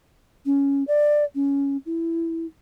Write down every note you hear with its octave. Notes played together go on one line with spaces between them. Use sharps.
C#4
D5
C#4
E4